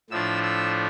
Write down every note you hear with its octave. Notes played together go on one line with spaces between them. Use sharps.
A2 F3 A3 D4 E6
E6